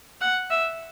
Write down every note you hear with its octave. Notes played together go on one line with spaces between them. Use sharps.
F#5
E5